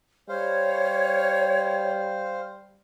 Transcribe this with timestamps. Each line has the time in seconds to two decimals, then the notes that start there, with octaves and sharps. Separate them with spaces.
0.29 G3 C5 C#5 F5